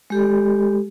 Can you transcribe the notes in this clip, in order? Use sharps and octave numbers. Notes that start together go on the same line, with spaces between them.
G#3 G4 A4